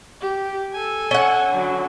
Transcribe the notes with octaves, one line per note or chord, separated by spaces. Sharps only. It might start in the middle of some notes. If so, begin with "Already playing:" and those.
G4
A4 G#5
C#4 F#5
D3 F#3